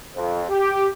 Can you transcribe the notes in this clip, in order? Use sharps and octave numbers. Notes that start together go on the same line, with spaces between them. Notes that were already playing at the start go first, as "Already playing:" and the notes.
F2
G4